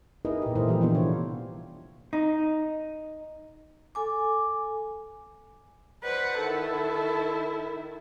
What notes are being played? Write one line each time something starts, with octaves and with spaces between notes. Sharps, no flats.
D#4 E4 G#4 A#4 B4 D#5
A#2 G4
A#2 E3 A3 E4 A#4 C5
E3 F3 G3 G4
E3 B3 D4 E4 F4 G4
C3 D4 C5 C#5
D#4
A4 G#5 D6
B4 C5 D5 F#5
D#3 E4 A4